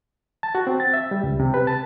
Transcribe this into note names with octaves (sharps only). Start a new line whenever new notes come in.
A5
F#4
C4
A6
E5
G3
C#2
C3
B4
A5